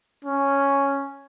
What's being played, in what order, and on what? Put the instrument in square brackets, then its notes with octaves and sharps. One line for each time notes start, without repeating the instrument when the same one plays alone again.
[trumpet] C#4